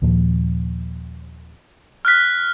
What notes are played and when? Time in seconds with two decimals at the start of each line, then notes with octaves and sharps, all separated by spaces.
0.02 D#2 A#2 F3
2.05 F6 F#6 B6